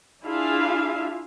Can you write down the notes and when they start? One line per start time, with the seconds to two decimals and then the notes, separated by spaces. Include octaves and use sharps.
0.23 D4 E4 F4 G#4 E5 F5